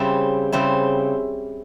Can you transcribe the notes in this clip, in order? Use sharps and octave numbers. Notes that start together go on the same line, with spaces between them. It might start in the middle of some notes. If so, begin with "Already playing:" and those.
Already playing: C#3 G3 C4 E4
C#3 G3 C4 E4